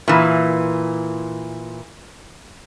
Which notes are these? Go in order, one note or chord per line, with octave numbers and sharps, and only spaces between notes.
A#2 E3